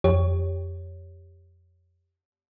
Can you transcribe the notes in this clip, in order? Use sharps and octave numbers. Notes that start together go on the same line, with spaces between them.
F2 G4 C#5